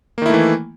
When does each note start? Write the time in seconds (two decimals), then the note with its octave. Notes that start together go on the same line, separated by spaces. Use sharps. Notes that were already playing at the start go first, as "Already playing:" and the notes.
0.18 A#3
0.22 D#3
0.26 E4
0.30 A3
0.34 E3